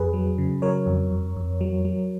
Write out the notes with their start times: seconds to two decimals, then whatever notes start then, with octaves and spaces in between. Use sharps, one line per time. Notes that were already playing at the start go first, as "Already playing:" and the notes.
Already playing: F2 G#4 B4
0.13 F#3
0.38 C#3
0.62 F#3 A#4 C#5
0.87 F2
1.12 F2
1.36 F2
1.61 F#3
1.85 F#3